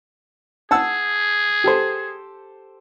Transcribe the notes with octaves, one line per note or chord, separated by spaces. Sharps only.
G#4 F#5 A5 E6
G4 A4 C5